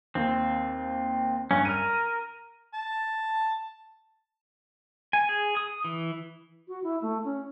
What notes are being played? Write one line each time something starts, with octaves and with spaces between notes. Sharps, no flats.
D#2 C4
G2 C#4
A#4 F6 D#7
A5
G#5
G#4
D#6
E3
F#4
E4
A3
C#4